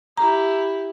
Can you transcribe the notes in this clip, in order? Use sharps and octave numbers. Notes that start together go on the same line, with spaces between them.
E4 G4 A#5